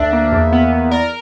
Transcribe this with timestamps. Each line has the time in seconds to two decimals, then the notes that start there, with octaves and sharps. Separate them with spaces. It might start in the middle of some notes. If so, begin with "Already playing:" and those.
Already playing: D2 D4 E5
0.13 A#3
0.32 E2
0.52 B3
0.72 E2
0.91 A#4 D5